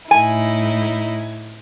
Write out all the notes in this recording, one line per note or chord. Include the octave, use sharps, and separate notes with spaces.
A2 D#4 E4 G#5